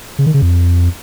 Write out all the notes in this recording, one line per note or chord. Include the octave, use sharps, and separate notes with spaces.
C#3
D#3
C#3
F2